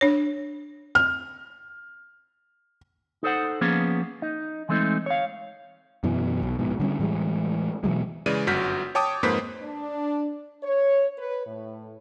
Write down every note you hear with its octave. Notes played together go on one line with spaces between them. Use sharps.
D4 C#5
F6
D#4 A4 C5 F#5
F3 A#3 B3 C#4 G#4
D#4
E3 G#3 A3 C4 D#4
C#5 F5
F#2 B2 E3
B1 B2
A#1 G#2 B2
D3 G3 C#4
A2 E3 G3 G#3
B2 E3 F#3 G#3
C#3 E3 G#3 D5 D#7
G1 F#2 F#4 F6 G6 B6
C#5 G5 A5 D6 D#6
F2 G#2 A#3 B4 C5 B6
D4
C#5
B4
A2